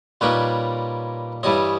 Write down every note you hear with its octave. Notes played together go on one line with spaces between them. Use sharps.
A#2 G3 A#3 D#4 B4 C#5
G2 E3 G3 C#5 D#5